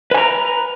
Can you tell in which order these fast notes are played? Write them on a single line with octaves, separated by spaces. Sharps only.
B4 G#5 A#5